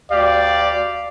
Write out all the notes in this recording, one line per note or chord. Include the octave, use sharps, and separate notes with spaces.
D2 G4 D5 F5